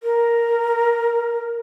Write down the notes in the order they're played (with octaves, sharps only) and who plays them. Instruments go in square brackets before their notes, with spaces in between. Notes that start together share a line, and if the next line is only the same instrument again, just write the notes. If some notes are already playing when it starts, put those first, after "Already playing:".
[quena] A#4